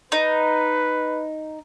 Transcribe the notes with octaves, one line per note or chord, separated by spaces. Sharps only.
D#4 B4